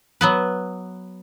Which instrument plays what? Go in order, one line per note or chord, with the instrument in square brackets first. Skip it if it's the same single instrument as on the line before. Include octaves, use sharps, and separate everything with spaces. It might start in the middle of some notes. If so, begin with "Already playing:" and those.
[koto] F#3 B3 B4